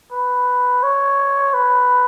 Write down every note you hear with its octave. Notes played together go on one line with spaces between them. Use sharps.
B4
C#5
B4